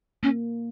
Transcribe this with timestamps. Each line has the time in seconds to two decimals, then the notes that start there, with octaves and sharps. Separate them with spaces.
0.23 A#3 C#4